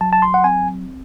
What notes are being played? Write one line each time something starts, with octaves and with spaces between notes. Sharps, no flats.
F#3 A5
A5
C6
F#5
C4 G#5